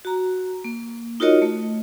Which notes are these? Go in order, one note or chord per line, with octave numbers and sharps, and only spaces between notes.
F#4 A#5
A#3
D#4 F4 F#4 A#4 C#5 D#5
A3